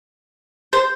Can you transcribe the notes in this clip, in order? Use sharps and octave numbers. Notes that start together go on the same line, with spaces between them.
C5